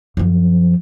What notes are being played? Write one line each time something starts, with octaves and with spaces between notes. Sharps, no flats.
F#2 F3